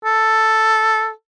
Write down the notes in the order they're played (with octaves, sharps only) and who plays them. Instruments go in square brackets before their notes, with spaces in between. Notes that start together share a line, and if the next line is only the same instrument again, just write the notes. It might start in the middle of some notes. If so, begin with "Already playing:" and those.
[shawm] A4